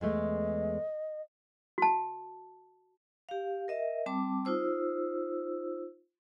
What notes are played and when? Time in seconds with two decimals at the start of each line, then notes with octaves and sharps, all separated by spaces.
0.01 E2 G#3 A3 D#5
1.78 F#4 A5
3.29 G4 F5
3.68 A#4 D#5 E5
4.06 G3 C4 A5 D6
4.45 D#4 F4 C5 E6